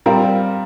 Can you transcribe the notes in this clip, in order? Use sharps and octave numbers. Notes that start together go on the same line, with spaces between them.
G3 C4 F4 A#4